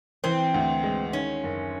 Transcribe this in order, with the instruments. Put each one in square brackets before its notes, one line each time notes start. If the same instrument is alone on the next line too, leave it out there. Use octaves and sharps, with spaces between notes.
[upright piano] E3 [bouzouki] C4
[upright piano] D2
G#3
[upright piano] D#3 [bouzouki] C#4
[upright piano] F#1